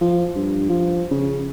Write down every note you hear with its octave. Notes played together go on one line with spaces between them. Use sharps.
F3
G2
F3
C#3